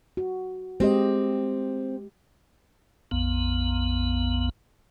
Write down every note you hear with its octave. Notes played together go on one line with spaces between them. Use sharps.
F#4
G#3 C4 G4 D#5
A#1 F2 B3